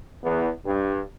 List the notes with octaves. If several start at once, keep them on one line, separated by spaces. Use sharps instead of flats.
E2 B3
G2